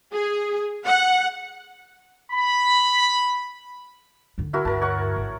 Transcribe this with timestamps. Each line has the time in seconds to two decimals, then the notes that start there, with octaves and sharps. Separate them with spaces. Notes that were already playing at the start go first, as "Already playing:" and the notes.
0.12 G#4
0.86 F#5
2.32 B5
4.38 D3 D#4
4.53 E4 F#4 A#4
4.65 D2 G2 A#4 A5
4.82 C#5 F#5 C#6
5.16 G#1